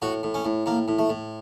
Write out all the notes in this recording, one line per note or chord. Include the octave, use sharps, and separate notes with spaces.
A2 F#4
A2
C#4
A2
A2 A#3
A2
A3
A2